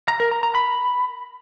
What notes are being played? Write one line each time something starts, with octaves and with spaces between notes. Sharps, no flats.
A#5
A#4
A#5
A#5
B5